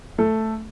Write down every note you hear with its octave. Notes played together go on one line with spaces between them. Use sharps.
A3 A4